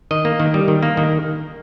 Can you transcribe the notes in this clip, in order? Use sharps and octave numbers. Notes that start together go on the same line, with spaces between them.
D#3 D#5
A#3
D#3
G3
D#3
A#3
D#3